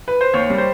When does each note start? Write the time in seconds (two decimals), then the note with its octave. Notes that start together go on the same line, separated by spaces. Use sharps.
0.08 B4
0.21 C5
0.34 D#2 C#5
0.50 G3
0.58 C5